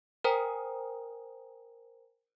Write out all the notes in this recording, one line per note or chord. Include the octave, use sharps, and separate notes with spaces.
A#4 C5 G5 G#5 A#5 D#6